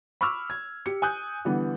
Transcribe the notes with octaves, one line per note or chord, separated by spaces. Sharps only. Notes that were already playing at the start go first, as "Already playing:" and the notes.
B5 C#6 D6 E6 F6
G#6
G4 C#7
G#5 D#6 F#6 G6
D3 E3 G3 B3